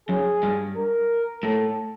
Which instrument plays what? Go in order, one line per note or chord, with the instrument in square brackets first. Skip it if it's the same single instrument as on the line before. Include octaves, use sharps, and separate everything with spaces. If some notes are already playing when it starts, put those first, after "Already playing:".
[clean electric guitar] F#2 [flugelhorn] G#4
[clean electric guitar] G2
[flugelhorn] A#4
[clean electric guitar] A2 [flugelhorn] A4